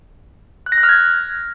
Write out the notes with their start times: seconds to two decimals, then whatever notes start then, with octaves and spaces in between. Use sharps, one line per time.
0.66 F#6
0.72 A#6
0.78 F#6
0.83 F6
0.89 G#6